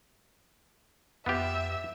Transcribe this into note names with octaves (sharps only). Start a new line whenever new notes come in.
F2 B3 F4 G4 E5